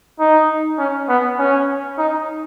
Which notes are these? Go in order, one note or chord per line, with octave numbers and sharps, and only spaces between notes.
D#4
C#4
B3
C#4
D#4